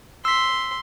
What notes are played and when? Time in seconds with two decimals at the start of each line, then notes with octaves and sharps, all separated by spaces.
0.25 C6 E6 B6